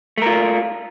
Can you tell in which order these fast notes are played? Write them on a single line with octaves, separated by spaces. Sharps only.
A3 A#4 F4